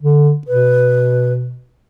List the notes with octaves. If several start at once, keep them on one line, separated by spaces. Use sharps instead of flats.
D3
B2 B4